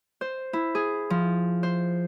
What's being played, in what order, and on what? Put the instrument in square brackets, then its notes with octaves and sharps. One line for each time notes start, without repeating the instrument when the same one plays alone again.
[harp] C5
E4
G#4
F3
C5